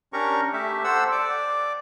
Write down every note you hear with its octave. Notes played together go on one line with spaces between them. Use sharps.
C#4 D4 G4 A#4 A#5 C#6
A3 G4 E5
A4 C5 F#5 E6
D5 D6